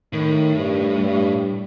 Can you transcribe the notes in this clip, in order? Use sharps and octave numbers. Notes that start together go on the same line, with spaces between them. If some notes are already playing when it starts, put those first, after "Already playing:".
A2 D#3
G2
G2